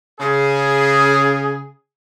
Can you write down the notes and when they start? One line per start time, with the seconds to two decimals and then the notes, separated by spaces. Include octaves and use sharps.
0.20 C#3 G#4